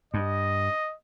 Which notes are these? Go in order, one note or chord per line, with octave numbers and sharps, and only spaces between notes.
G2 D#5